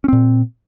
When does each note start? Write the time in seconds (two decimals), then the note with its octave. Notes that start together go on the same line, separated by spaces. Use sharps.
0.04 C#4
0.08 C4
0.13 A#2